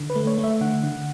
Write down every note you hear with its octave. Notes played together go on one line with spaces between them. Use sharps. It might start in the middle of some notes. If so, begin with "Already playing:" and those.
Already playing: D3
B4
A3
C#5
A3
E5
D3 F#5
D3